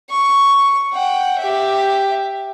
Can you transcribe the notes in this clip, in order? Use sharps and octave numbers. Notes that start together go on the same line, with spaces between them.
C#6
F#5 G5
G4 E5